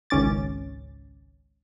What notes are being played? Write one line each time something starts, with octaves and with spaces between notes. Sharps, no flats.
G#1 C#2 C#4 D6 A6